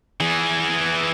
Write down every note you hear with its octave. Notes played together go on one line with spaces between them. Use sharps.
E3 G#4